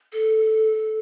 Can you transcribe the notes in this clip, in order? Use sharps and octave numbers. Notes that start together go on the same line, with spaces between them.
A4